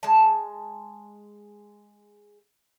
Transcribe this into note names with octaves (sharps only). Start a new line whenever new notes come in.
G#3 A5